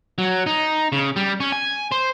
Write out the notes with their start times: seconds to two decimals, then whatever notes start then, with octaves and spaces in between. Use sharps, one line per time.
0.18 F#3
0.46 D#4
0.92 C#3
1.16 G3
1.40 C#4
1.52 G#5
1.92 C5